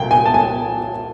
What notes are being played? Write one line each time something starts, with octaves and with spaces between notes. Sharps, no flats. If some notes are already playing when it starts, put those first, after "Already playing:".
Already playing: C2 A#2 G5
G#5
A5
G#5